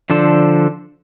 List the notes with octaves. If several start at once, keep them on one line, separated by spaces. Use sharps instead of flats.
D3 F3 D4 A4 C5